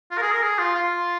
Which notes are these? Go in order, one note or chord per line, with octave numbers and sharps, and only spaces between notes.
F4
A#4
G#4
A#4
G#4
F4
F4